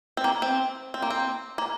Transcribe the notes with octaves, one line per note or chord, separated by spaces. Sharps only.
C4
A#3
C4
C4
A#3
C4
A#3